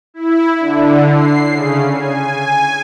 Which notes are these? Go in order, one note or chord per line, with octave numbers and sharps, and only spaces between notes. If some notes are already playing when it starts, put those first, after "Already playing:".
E4
D3
C7
C#3
G#5